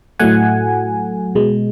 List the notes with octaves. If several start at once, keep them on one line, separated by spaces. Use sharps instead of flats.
A2 F#3 A3 F#5 G#5
B2 G#3